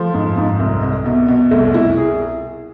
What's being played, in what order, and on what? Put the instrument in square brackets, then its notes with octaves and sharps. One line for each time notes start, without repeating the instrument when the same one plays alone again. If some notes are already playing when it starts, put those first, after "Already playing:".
Already playing: [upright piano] F3 A3
G#2
G#2
C2
C2
B2
B2
C2 A3
C2 E4
G#4